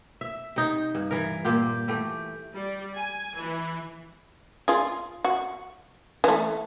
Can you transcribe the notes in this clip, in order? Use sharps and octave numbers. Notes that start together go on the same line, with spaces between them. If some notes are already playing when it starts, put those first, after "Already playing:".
E5
C3 D#4
G2
E3 A#4
A#2 A#3 F4 G4
E3 A3 G4
G3
G#5
E3
F4 G#4
F#4
E3 A3